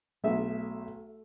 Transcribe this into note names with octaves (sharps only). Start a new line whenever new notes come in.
B1 A3 G#4 E5